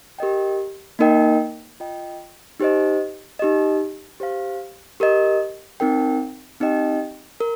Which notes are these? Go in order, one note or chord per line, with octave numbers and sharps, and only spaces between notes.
G4 A#4 D#5 G5
A#3 D#4 A#4 D#5 G5
F4 D#5 G5
D#4 G4 C5 D#5
D#4 G4 D#5
G4 C5 F5
G4 A#4 D#5
C4 D#4 A#4 G5
C4 D#4 G4 D#5 G5
A#4